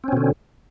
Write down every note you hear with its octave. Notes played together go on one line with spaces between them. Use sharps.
B2 D3 C4 C#4